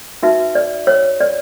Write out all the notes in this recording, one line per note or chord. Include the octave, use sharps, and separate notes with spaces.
D#4 F#4 B4 E5
D5
C#5
D5